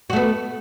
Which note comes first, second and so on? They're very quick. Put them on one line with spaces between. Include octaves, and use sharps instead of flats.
F#4 A3 B3